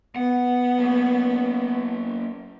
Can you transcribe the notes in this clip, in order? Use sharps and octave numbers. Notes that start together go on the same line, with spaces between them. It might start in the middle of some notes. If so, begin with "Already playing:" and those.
B3 F#5
F#3 A#3